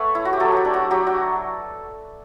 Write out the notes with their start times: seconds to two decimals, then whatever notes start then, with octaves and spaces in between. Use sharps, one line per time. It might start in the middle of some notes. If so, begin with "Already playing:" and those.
Already playing: A3 B4 C#5 F#5
0.15 E4
0.25 F#4
0.33 G4
0.40 F#3 A4
0.52 F#4 G4
0.65 D4
0.74 F#4
0.91 F#3 G4
1.07 F#4